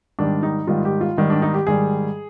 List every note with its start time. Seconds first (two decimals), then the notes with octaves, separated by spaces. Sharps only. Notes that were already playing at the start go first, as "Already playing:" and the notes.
0.19 G#2 D#3 G3 D4
0.43 D#4
0.67 G#2 D#3 G3 F4
0.85 G4
1.01 F4
1.18 G#2 D#3 G3
1.30 D4
1.42 D#4
1.54 G4
1.67 G#2 D#3 G3 G#4